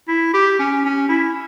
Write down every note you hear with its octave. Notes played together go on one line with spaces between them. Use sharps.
E4
G4
C#4
C#4
E4